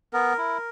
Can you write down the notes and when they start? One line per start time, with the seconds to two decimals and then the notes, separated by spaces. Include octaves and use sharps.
0.13 B3 A#4
0.38 E4